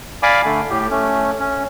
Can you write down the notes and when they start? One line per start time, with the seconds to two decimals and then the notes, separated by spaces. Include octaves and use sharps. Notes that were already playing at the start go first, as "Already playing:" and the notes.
0.23 D5 F5 G#5 B5 D6
0.45 D3 A3
0.70 A2 G4
0.90 A3 C#4
1.39 C#4